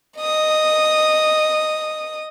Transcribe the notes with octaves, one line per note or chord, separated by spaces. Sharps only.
D#5 D#6